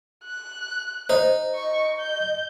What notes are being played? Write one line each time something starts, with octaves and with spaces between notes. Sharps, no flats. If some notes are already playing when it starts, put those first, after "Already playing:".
F#6
D#4 C5
D#5 C#6
G6